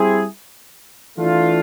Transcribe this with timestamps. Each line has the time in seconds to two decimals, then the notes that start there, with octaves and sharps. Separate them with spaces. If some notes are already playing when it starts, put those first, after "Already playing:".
Already playing: G3 C4 E4 G#4
1.17 E3 A3 D4 F4